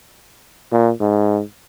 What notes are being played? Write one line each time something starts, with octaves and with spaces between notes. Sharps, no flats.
A#2
G#2